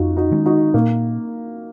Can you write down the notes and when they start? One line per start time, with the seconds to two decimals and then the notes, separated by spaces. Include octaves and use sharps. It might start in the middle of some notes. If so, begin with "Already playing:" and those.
Already playing: F2 D#4 F4 F#4
0.17 D#4 F#4
0.31 D#3 G#3 C#4
0.46 D#4 F#4
0.74 A#2 A#3